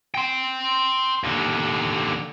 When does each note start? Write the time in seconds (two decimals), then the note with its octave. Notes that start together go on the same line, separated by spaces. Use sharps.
0.15 G5 C6
1.24 D#2 D3